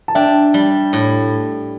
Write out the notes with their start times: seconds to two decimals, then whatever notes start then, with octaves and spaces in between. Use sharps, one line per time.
0.08 A5
0.15 D4 E5 G5
0.54 G3
0.93 A2